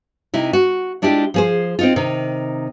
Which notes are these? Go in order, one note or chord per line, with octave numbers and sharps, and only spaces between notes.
C3 D#4 E4
F#4
G#3 D4 E4 F4 G4
F3 G#4 C5
C4 D#4 F4
C3 D#3